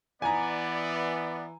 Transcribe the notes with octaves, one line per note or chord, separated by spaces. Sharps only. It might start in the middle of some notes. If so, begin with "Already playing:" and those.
E3 B3 D5 G#5 A#5